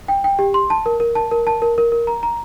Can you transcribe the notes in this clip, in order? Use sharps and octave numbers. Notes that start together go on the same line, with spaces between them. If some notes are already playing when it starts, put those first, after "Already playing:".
G5
G5
G4
C6
A5
A#4
A#4
A5
A#4
A5
A#4
A#4
A#4
A#5
A#5